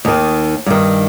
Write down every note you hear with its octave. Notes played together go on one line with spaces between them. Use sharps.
D#2 D#3
G2 D#3